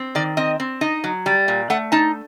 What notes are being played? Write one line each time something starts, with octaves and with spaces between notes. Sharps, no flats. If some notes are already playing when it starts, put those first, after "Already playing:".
Already playing: C4
D#3 D5
C4 D#5
C4
D#4 D#5
F#3
G3
A#2
A3 F#5
D#4 A5